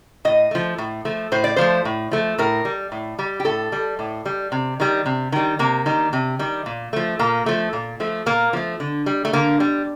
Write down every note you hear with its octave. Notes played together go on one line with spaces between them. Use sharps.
A2 D#5
F3 A3
A2
F3 A3
A2 C5
D5
F3 A3 C5
A2
F3 A3
A2 A#4
G3
A2
G3
G4
A2 A4
G3
A2
G3
C3
D#3 G3
C3
D#3 G3
C3 A#3
D#3 G3
C3
D#3 G3
A#2
F3 A3
A#2 A#3
F3 A3
A#2
F3 A3
A#2 A#3
F3 A3
D3
G3
A3
D3 A#3
G3